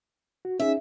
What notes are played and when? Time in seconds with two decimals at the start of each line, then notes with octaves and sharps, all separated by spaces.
0.45 F#4
0.60 C#4 D#4 G#4 E5